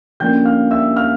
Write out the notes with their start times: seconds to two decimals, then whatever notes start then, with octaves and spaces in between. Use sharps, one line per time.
0.20 D3 F3 A#3 C#4 G5 G6
0.45 F5 F6
0.71 E5 E6
0.97 F5 F6